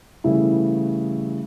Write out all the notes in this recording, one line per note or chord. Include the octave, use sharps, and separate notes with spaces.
C#3 E3 G3 A3 E4